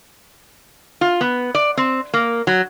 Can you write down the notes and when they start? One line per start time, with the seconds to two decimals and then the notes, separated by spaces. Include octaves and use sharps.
1.01 F4
1.21 B3
1.55 D5
1.77 C4
2.14 A#3
2.47 F#3